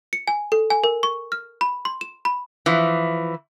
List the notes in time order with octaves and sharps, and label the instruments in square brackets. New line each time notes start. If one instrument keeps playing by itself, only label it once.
[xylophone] C#7
G#5
A4
G#5
A#4
C#6
F6
B5
C6
E7
B5
[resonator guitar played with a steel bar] E3 F3